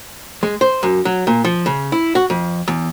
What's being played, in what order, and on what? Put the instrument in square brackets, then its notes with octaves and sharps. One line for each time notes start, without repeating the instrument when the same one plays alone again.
[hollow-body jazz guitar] G#3
C5
F#2
F#3
A#2
F3
C#3
E4
F#4
F2
E2